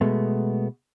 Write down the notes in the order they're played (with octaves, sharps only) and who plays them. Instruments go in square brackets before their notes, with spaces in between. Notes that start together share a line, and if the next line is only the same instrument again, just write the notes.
[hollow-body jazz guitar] B2 G#3 A3 B3